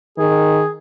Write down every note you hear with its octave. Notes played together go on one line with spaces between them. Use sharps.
D#3 G#4